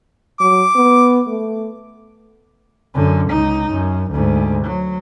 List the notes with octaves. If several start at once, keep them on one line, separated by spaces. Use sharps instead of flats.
F#3 D6
B3
A3
F#2 D3
C#2 D#4
F#2
D2 G#2
F#3